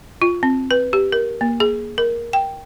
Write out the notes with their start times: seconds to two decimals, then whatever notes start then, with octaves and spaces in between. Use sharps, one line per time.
0.22 F4
0.43 C4
0.71 B4
0.93 G4
1.12 A#4
1.41 A#3
1.60 G#4
1.98 A#4
2.33 G5